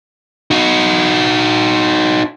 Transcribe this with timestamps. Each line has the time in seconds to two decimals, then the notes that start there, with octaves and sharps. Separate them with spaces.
0.51 D#4 F#4